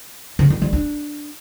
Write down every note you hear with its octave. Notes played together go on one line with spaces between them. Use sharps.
C#3
D#3
G3
D4